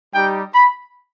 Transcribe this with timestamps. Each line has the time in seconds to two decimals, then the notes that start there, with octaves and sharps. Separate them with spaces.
0.14 G3 D#4 G4 G5
0.54 B5